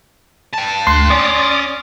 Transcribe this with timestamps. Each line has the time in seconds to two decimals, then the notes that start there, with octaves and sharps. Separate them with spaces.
0.54 G5 A5
0.87 D2 C6 F#6
1.10 C#4 D5 D6 D#6